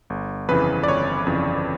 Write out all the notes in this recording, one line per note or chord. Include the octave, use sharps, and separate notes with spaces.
G1
F2 C#3 E3 B4
D5
G1 C#5
F2 C#3 E3